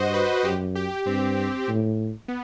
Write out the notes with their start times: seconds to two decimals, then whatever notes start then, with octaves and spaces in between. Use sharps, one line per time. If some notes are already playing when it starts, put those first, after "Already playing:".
Already playing: G2 F#4 C5 D#5
0.14 B4
0.44 F#2 G4
0.75 G4
1.06 G2 C4
1.68 A2
2.28 B3